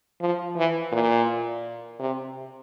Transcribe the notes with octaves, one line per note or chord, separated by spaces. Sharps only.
F3
E3
A#2
C3